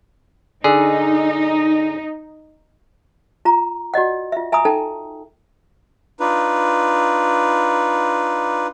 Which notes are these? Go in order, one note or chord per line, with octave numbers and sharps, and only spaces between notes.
D3 D#4 G#4
F4 A#5
F#4 D5 D#5 F#5
F4 E5
E5 G#5 A#5 B5 D#6
D#4 A4 G5 A5
D4 D#4 F4 B4